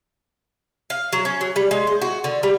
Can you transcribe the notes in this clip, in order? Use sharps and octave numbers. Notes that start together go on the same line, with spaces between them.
F5
F#3
C#4
F#3
G3
G#3
C5
F#4
D3
G3